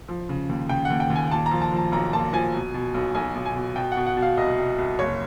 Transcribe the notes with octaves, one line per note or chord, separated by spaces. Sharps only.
F3
C#3
D#2
C#3 G5
D#2 F#5
G5
D#2
G#5
A#2 A5
A#5
F3
A5
F3 A5
B1 A#5
A#2 A5
F3 G#5
B2
B2
B1
B1 G#5
B1
G#5
B2
B2 G5
F#5
B2
F#5
B2
F5
C2 D#5
C2
C2
F#1 C#5